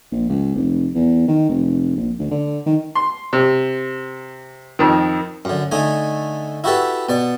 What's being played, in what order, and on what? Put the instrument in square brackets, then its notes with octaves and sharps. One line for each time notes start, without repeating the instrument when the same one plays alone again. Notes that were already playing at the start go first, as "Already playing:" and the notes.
[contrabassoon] A#1
C#2
F1
E2
D#3
F1
A#1
D2
D3
D#3
[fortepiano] C6
C3
F2 D#3
[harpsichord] F#2 D3
D3 A3 D#4 G#5
E4 F#4 G4 A4 B4
B2 D5